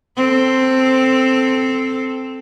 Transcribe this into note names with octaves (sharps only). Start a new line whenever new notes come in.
C4 A4